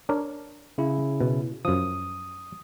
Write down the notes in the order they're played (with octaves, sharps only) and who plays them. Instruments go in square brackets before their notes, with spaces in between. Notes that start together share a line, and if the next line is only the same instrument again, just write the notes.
[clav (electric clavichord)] D4 A#4 C#5
[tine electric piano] C#3 E4
[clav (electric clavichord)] B2
[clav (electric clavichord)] F#2 F3 [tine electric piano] D#6